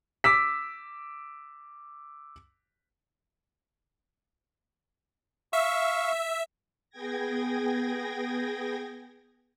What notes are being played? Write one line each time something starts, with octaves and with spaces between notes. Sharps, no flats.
D6 E6 B6
E5 F5 C#6
B3 G#4 G5 G#6 A#6